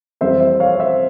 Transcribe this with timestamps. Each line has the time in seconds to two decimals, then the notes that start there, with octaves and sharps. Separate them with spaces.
0.21 F2 E3 G3 C5 E5
0.40 C5 E5
0.60 C#5 F5
0.79 C5 E5